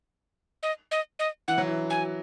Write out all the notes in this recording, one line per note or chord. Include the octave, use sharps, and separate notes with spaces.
D#5
D#5
D#5
E3 F#5
F#3
E3
G#5